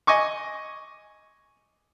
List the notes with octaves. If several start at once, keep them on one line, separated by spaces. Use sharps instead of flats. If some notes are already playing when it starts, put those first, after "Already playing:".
D#5 G#5 C#6 D6